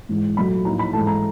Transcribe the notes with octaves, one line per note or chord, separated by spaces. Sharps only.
G#2 E3 G#3
A#2 F#3 A3 B5
A2 F3 A#3 D#4 A#5
B5
G#2 E3 A3 A5
A#5